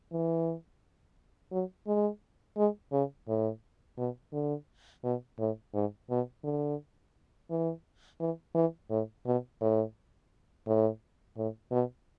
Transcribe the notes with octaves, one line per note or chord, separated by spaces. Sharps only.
E3
F#3
G#3
G#3
C#3
A2
B2
D3
B2
A2
G#2
B2
D3
E3
E3
E3
A2
B2
A2
A2
A2
B2